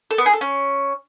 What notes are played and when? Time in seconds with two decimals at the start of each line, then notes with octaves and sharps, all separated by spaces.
0.11 A4
0.18 B3
0.26 G#4
0.33 A4
0.41 C#4